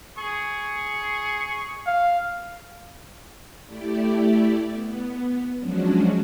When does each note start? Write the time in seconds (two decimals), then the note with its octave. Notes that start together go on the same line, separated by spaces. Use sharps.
0.18 G#4 C#6
1.87 F5
3.67 A3 E4 G4 D5
4.71 B3
5.58 F3 F#3 G#3 C#4 D4 F#4